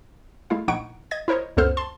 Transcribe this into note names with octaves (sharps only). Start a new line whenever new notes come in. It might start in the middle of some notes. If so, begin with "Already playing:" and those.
G#3 A3 E4 F5
A#1 D#4 E4 F#5 C#6 D7
D#5 G#6 A#6
E4 A#4 C5 C#5 D#5
C#2 F#2 B3 A4 C5 F6
A5 C6